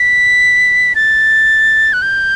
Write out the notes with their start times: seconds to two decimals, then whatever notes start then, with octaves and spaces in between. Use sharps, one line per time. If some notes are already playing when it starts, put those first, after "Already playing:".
Already playing: B6
0.95 A6
1.93 F#6
2.02 G6